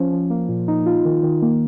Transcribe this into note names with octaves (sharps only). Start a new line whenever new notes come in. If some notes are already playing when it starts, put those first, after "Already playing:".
Already playing: F3 C#4
F3
A#3
A#2
D#4
F4
D#3
D#3
A#3